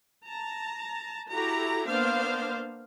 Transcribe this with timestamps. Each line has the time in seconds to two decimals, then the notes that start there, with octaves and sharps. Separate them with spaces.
0.24 A5 A#5
1.32 E4 F#4 G4 A4 A#5
1.87 A#3 B3 D4 C5 F5